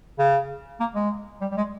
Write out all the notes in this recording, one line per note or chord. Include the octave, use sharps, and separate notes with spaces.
C#3
A#3
G#3
G3
G3
G#3